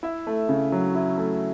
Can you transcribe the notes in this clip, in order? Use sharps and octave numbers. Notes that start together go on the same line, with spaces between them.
E4 E5
A3
C#3
F#3
E4
A3